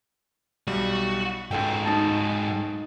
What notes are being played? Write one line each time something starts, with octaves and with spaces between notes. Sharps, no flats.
B1 G3 F#4
C#2 G#2 F#4 A4 G5
D#4 A5